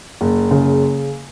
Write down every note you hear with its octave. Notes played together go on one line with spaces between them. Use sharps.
F#1
C#3